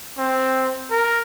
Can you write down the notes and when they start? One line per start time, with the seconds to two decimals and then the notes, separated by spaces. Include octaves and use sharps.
0.18 C4
0.91 A#4